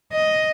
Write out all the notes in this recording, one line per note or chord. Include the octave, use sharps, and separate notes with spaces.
D#5